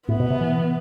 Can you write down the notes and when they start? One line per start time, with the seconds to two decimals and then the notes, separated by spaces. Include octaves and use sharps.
0.08 A2 B3
0.20 B2
0.30 C3
0.41 E3